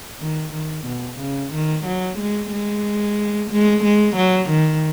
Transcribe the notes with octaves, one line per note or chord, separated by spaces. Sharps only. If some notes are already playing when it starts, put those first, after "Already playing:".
D#3
D#3
B2
C#3
D#3
F#3
G#3
G#3
G#3
G#3
F#3
D#3